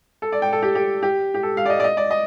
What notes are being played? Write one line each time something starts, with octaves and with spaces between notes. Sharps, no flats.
A4
D5
G5
A4
G4
G4
G4
G4
A4
F5
D5
D#5
D5
D#5
D5
D#5